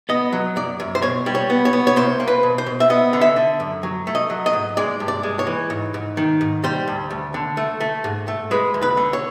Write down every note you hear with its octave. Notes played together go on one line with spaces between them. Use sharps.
B3 D#5
F#3
F#2 D5
F#2
C5
B2 C#5
G3
C#5
B3
C#5
B3
C#5
C2 C5
A#3
B4
B2
C5
B2
E5
B3 D#5
D3
E5
D3
F#2
F#3
A3
D#5
F#3
D#5
G#2
G#3 D5
G2
D5
G#3
C#5
E3
G#2
G#2
D#3
G#2
G3 C5
D2
D2
D3
A3
A3
G#2
A3
G#3 B4
D2
B4
D3
C#5